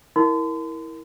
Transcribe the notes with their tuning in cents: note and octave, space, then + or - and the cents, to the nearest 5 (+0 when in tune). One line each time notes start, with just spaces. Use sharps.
E4 -15 A#4 +0 C6 -40